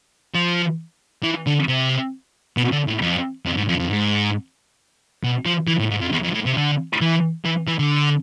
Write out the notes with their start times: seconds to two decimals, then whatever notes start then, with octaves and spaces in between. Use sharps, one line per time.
0.35 F3
1.23 E3
1.47 D3
1.68 C3
2.57 B2
2.72 D3
2.87 A2
3.02 F2
3.46 F2
3.57 G#2
3.69 F2
3.79 F2
3.90 G#2
5.23 B2
5.46 F3
5.68 E3
5.79 A2
5.91 G#2
6.01 F2
6.12 E2
6.24 F2
6.34 A2
6.46 C3
6.57 D3
7.01 E3
7.45 E3
7.68 E3
7.79 D3